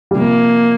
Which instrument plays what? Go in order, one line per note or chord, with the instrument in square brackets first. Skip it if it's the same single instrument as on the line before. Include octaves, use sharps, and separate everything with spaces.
[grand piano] G3
[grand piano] C3 F3 [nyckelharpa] A#3